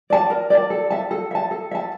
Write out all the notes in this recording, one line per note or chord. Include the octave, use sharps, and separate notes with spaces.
D5 A5
A#4
D5 A5
A4
E5 A5
A4
E5 A5
A4
E5 A5